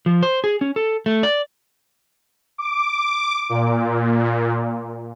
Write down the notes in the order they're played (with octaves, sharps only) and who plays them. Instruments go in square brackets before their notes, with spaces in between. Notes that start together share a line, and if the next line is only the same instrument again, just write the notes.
[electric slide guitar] F3
C5
G#4
C#4
A4
A3
D5
[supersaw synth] D6
A#2